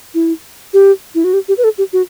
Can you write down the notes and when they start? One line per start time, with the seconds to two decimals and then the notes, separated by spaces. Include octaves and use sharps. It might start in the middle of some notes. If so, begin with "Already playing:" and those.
0.14 E4
0.73 G4
1.15 E4
1.24 F#4
1.33 G4
1.48 G4
1.58 B4
1.64 A4
1.78 G4
1.93 F#4